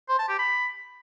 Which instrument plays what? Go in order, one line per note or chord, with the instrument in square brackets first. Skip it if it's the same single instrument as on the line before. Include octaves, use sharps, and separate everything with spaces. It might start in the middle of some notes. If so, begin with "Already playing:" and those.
[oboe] C5
A5
G4
B5